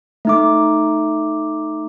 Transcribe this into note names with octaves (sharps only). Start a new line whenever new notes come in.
A3 D#4 D6